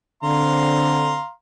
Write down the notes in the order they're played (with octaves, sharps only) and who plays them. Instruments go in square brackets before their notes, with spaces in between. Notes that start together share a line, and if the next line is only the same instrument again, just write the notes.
[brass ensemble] D3 C4 [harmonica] F5 A#5 C6